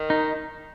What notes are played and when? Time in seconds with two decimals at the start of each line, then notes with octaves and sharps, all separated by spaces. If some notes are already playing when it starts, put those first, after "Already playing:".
Already playing: D#3
0.10 D#4